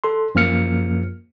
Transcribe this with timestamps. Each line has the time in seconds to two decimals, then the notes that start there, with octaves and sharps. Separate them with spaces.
0.04 A4 C6
0.35 F#2 F3 A#3 F6 C#7